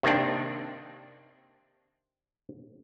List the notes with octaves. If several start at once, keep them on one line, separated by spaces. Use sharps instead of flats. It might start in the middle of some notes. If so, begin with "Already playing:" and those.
C3 D#3 A#3 C4 D4